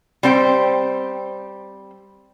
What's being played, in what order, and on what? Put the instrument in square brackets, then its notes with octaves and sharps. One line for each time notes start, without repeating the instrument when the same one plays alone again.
[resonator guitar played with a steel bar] G3 C4 C5 G5